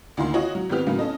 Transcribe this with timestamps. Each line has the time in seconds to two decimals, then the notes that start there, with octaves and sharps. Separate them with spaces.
0.17 D2 D#3 A#3 C6
0.34 F4 F#4 C#5 D#5
0.55 F#3
0.69 G#1 B3 C4 G4 F6
0.86 A2 C#3 F#3 A#3
0.99 C#4 A4 D#5